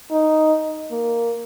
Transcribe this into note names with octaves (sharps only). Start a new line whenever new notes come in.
D#4
A#3